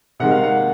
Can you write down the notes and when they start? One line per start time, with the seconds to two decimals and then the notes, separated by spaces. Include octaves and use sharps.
0.20 C3 D#3 G#3 F#5
0.31 F5
0.44 F#5